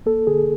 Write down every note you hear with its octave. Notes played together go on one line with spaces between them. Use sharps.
A#3 A4
D3 G#4